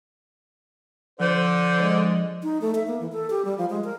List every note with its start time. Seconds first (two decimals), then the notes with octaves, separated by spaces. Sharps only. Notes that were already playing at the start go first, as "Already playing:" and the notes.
1.19 D3 F3 C5
1.81 G#3
2.43 D#4
2.62 A3
2.75 E5
2.87 A#3
3.00 E3
3.12 A4
3.30 G4
3.45 G3
3.58 F3
3.70 G#3
3.84 A#4